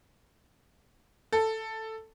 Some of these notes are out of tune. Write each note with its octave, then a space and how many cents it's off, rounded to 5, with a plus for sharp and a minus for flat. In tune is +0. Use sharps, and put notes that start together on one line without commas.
A4 +5